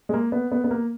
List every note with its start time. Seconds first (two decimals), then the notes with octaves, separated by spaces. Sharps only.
0.09 G#3
0.13 A#3
0.32 B3
0.51 B3
0.64 B3
0.71 A#3